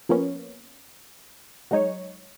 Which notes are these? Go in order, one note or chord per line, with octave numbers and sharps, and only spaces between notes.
F3 A#3 B3 C#4
F#3 G#3 D#4 C#5